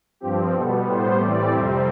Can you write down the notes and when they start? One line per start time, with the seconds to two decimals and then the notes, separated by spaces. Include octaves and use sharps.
0.20 G2 F3 C4 G4
0.53 B2 G3 B3 A4
0.85 A2 G3 B3 C5
1.17 A2 E3 G3 C4 D5
1.49 F2 C3 G3 C4 E5